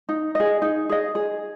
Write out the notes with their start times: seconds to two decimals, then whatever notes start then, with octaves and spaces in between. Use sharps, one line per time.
0.09 D#4
0.35 G#4 D#5
0.62 D#4
0.89 G#4 D#5
1.15 G#4